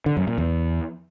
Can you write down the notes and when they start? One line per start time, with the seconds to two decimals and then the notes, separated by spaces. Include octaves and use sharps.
0.06 D3
0.17 F#2
0.27 A#2
0.38 E2